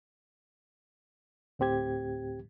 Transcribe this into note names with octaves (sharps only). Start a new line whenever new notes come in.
D2 A2 C4 G4 G#6